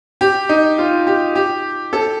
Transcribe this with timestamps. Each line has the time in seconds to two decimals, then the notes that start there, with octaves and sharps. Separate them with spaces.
0.21 G4
0.49 D#4
0.78 F4
1.07 G4
1.35 G4
1.93 A4